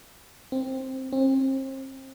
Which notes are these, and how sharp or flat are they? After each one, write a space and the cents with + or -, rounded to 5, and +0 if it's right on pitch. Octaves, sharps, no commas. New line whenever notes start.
C4 +5
C4 +35